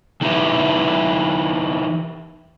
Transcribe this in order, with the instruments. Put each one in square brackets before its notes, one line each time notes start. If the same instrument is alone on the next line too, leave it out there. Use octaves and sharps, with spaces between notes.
[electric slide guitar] E3 D#4 E4 G4 B4